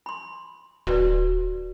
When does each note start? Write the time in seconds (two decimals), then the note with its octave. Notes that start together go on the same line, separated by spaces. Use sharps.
0.06 B5 C6
0.87 D1 F#4 B4 D5